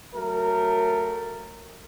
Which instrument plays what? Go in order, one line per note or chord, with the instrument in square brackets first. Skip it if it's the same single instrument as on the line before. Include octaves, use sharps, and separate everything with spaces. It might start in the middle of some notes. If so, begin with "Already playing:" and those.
[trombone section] F#3 A3 A#4